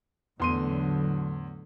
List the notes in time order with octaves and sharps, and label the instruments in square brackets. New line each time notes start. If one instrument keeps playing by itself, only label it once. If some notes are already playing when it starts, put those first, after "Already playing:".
[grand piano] E2 C6 D#7 [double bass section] A2 D3 F#3